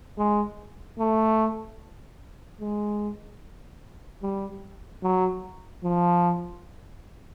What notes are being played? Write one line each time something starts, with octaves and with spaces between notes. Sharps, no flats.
G#3
A3
G#3
G3
F#3
F3